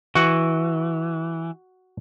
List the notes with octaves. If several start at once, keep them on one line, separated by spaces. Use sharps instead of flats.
E3 F#4 F#5